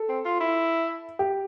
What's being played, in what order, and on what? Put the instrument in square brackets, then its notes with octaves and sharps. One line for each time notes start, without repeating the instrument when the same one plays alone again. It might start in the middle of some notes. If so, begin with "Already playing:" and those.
Already playing: [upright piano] A4
[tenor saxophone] C4
F4
E4
[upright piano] G4